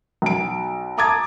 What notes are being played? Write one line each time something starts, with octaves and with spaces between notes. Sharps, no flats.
B1 D7
A5 A#5 D6 D#6 G#6 A6